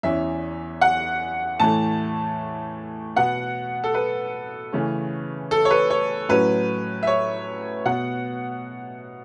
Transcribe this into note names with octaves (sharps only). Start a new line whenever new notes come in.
E2 E3 C#4 E5
F#5
A2 E3 A3 A5
B2 B3 F#5
A4
B4
C#3 E3 A3 C#4
A4
C#5
B4
C#5
A2 F#3 C#4 B4
E5
C#5
B2 B3 F#5